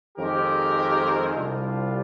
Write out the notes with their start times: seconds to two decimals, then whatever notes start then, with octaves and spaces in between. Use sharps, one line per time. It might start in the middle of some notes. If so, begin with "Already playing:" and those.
0.18 F2 D#3 G#3 C4 G4 A#4
1.37 C2 C3 G3 D4 F4